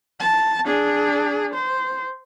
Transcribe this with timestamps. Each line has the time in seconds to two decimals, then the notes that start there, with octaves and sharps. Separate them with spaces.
0.20 A5
0.65 D4 G#4
1.54 C5